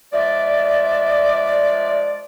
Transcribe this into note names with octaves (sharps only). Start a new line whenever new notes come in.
F3 G#3 D5 E5